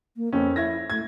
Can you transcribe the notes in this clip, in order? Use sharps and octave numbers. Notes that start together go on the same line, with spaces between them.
A#3
F2 A#3 C4 C#4
E4 E5 G#6 A#6
A3 G#6